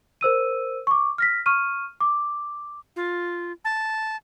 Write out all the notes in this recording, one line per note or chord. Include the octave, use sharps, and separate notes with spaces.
A#4 C5 E6 D#7
C#6 D6
F6 A#6 B6
C#6 F6 D#7
D6
F4
A5